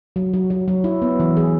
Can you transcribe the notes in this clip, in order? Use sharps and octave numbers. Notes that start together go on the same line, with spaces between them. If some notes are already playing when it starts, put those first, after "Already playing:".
F#3
F#3
F#3
F#3
E4
B3
E3
G#4